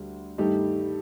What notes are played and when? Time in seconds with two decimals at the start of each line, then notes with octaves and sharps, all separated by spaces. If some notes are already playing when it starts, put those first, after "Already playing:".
Already playing: D2 G3
0.38 G2 D#3 A3 D#4 G4